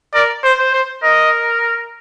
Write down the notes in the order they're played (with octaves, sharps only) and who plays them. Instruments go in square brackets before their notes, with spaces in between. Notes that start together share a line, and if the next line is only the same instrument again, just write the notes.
[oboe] A#4 [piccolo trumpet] D5
[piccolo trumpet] C5
[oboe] C5
[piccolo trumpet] C5
[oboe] A#4 [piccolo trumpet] D#5